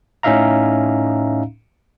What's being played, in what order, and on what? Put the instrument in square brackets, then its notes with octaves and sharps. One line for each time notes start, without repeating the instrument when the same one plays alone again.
[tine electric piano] A2 C#4 D#4 E5 F5 A#5